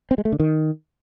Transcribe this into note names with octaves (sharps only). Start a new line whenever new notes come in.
C4
G#3
A3
D3
D#3